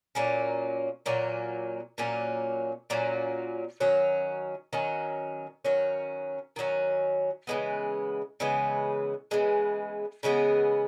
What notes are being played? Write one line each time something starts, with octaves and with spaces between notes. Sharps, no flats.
A#2 F#3 A#3 C#4
A#2 F#3 A#3 C#4
A#2 F#3 A#3 C#4
A#2 F#3 A#3 C#4
D#3 F#3 C#4
D#3 F#3 C#4
D#3 F#3 C#4
D#3 F#3 C#4
C#3 E3 G#3 B3
C#3 E3 G#3 B3
C#3 E3 G#3 B3
C#3 E3 G#3 B3